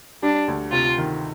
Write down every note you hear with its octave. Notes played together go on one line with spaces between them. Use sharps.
G3 D4
D2
C3 F4
D#3